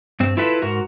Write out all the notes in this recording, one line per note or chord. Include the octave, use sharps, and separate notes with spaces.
G2 C4
E4 F4 A4 B4 E5
G#2 F#4 A#4